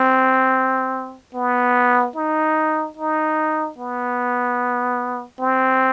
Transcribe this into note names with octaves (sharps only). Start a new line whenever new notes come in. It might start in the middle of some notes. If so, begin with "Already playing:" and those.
Already playing: C4
B3
D#4
D#4
B3
C4